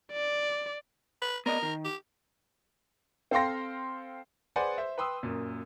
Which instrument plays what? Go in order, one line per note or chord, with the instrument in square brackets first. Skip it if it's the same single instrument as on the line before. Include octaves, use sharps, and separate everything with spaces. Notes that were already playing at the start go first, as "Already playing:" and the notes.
[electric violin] D5
[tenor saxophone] B4
[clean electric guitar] B3 D5 D#5 [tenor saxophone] A#4
[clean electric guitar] D#3
[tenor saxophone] G4
[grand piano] C4 A4 F5 G5 C6 A#6
G#4 B4 C5 D5 F#5 G#5
C5 E5
B4 G5 C6 D#6 E6
F#2 A#2